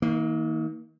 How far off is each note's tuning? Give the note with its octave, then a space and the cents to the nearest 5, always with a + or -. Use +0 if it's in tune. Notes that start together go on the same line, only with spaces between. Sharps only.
D#3 +45 A#3 +0